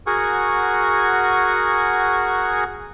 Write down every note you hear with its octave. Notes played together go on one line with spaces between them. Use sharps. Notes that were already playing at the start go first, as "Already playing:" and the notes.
F#4 G#4 A#4 F#5 G#5 C#6